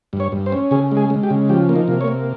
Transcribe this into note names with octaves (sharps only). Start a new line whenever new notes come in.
G2
C#5
G2
C5
C#4
C#3 G#4
G#3
G#4
G#3
G4
C#3
F3 G4
A#3
D#4
C3
C#5
A#3